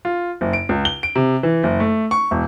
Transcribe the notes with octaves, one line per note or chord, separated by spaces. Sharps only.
F4
F#1
D7
C#2
G7
D7
C3
E3
F#1
A3
C#6
E1